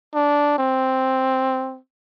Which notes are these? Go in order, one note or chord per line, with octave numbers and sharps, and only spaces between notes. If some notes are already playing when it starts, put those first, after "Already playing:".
D4
C4